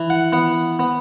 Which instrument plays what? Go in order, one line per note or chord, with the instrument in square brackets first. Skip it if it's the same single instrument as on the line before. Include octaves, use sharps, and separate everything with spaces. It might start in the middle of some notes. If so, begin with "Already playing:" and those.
Already playing: [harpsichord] E3
F#5
B3 F#5
B3